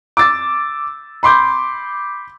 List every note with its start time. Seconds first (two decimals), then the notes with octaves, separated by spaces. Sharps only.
0.17 D6 E6 A6
1.23 B5 C6 D6 G6